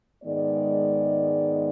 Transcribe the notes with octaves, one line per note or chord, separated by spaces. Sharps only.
G#2 D#3 G#3 B3 D5